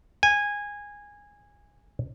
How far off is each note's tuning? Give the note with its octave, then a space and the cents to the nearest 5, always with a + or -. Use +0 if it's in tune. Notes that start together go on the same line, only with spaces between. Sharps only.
G#5 -15